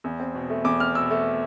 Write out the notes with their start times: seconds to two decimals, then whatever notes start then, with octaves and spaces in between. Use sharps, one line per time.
0.04 E2
0.20 C4
0.35 B2
0.50 A3
0.64 E2 D6
0.80 C4 F6
0.95 B2 E6
1.10 A3